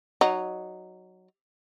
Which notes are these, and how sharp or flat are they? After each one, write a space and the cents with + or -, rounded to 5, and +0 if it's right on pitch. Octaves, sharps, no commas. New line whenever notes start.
F#3 +0 D#4 -15